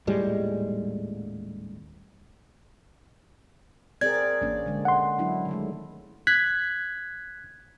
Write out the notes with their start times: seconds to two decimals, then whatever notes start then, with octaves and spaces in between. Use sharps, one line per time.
0.07 D#1 A2 G3 G#3
4.01 C4 G#4 A#4 D5 G#6
4.41 A1 A#3 C#4 D4
4.66 D3 G#3
4.85 F#5 C6
5.18 F#3 D4 E4
5.49 D#3 G#3 A3
6.27 F#6 G#6 B6